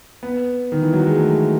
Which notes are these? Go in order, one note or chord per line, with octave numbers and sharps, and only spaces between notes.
B3
D#3
E3
F#3
G#3
A3